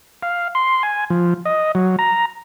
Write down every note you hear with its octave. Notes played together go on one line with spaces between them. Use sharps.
F5
C6
G#5
F3
D#5
F#3
A#5